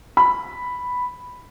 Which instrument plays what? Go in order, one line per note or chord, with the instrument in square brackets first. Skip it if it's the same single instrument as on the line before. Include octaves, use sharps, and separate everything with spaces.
[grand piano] B5